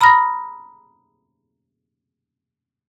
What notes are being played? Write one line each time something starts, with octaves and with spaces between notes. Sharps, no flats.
A#5 B5 D#6 F6 A#6